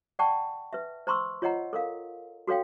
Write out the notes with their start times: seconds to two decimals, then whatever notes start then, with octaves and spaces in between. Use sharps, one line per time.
0.19 D5 F#5 G5 A5 C#6
0.73 B4 E5
1.07 C5 A#5 C6 C#6 E6
1.42 F4 C#5 D#5 F#5 A#5
1.73 A4 A#4 F5
2.47 F#4 A4 C#5 F5 G5